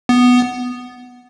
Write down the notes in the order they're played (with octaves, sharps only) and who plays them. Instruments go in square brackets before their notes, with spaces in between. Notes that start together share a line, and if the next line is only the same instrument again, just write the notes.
[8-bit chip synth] B3